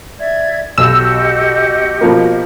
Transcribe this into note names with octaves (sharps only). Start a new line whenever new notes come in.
D5 E5 G#6
B1 F#4 G4 D#5 E6
B2 F3 A#3